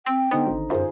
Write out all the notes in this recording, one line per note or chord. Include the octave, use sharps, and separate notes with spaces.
C4 G5
D3 B3 D#4 C5
G#1
F#2 F4 G#4 C5